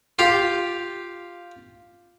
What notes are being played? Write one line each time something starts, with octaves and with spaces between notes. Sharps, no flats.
F4 G4 F5